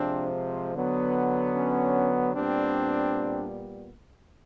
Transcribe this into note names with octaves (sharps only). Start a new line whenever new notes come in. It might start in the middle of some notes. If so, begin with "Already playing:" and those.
Already playing: C3 F3 G#3 C4 D4
D3 F#3 B3
C#4
A#2 G3 B3 C4 D4